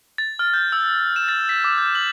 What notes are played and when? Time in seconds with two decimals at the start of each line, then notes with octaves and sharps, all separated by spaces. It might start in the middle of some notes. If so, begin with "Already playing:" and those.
0.18 A6
0.39 F6
0.54 G6
0.72 E6
1.16 E7
1.29 A6
1.49 B6
1.64 D6
1.78 G6
1.95 F#7